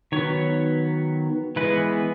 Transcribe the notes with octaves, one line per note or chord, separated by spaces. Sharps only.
D#3 F#3 B3 C#5
E3 G#3 B3 B4